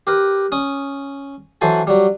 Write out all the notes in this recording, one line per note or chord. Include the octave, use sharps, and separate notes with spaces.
G4 A#4 B4
C#4 D#6
E3 F#3 A4 C5 G#5 A5
F#3 G3